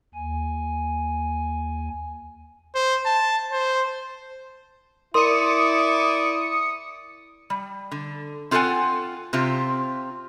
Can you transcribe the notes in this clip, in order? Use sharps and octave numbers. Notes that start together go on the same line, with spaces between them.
D#2 G#5
C5
A5
C5
E4 A#4 D5 C6 D#6 C#7
G3
D3
C4 F4 A4 D5 F#5 G#5
C3 C4 F4 G4